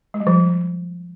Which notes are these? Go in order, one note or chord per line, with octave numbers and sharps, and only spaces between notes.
G#3
G3
F3